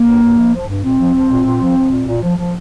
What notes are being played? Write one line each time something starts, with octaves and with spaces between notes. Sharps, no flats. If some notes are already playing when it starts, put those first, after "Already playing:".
Already playing: A#3
G2
G2
F3
F3
G2
A#2 C4
F3
F3
A#2
A#2
F3
F3
A#2
A#2
F3
F3